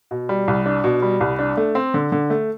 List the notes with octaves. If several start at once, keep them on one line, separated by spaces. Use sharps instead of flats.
B2
G3
C2
D4
B2
G3
C2
D4
A3
C4
D3
D3
A3